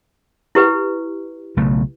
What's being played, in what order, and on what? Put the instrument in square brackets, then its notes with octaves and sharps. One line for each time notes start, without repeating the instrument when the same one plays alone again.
[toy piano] E4 G4 B4
[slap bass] B1 C#3 A3